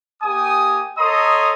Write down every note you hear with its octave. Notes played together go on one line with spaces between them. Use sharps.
A#3 G4 G#5 D#6
A4 C#5 D#5 A#5 C6 D#6